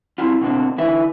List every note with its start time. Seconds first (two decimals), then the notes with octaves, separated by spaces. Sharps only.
0.18 C4 E4 F4
0.41 B2 D3 A#3 C4
0.78 D3 E4 B4 E5